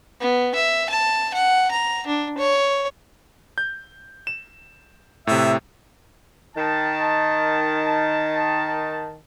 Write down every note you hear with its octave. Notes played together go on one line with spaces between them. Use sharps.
B3
E5
A5
F#5
A#5
D4
C#5
G6
E7
A2 C3 E5
D#3 A5